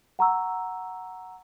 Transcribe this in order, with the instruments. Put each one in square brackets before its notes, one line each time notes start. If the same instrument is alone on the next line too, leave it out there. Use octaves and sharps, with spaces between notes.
[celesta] F#5 A#5 C#6 E6